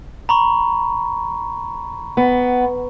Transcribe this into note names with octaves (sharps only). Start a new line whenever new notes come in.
A#5 B5 C#6
B3